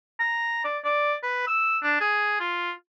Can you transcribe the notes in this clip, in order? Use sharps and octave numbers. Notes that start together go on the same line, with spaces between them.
A#5
D5
D5
B4
E6
D4
G#4
F4